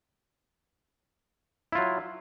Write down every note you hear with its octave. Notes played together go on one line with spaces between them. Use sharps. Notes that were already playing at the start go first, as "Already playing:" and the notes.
F#3 E4 F4